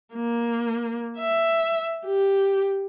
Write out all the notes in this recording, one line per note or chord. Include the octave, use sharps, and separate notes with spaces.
A#3
E5
G4